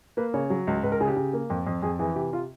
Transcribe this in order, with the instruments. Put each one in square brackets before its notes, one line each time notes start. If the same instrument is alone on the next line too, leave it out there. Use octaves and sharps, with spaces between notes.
[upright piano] A#3 B4
C#3 C#5
F#3
C#2
C#2 B4
A#4
C#3 G#4
G4
C#3
A#3
F2
F2
F2 G#4
E3 G#4
C3 G4
F4